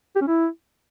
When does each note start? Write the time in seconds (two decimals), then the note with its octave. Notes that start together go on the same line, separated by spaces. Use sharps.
0.16 G4
0.21 C#4
0.27 E4